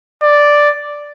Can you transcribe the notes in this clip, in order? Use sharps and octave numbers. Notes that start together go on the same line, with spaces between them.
D5